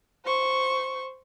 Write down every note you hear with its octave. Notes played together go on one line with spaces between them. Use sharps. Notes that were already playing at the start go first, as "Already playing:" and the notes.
C5 C#6